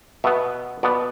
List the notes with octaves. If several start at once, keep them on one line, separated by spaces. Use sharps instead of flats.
B2 B3 E5
B2 B3 D5